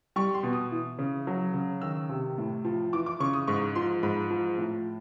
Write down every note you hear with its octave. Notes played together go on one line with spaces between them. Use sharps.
G3 C#6
C6
B2
D#6
E3
C#3
F#3
C#3
D#3 E6
C3
A2
F3
E3 D6
D6
C#3 C#6
D#6
G#2 C#6
F3 C6
G#2 B5
F3
A2